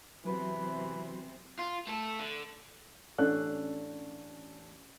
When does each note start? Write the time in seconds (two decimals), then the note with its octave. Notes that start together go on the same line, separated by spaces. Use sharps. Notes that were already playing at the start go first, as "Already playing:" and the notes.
0.25 E2 C3 E3 F#3 F#4 B4 C5
1.59 F4
1.87 A3 A4
2.19 D3
3.18 A1 C#4 D4 A4 F#6